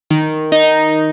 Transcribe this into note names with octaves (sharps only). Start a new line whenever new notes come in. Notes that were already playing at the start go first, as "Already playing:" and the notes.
D#3
D#4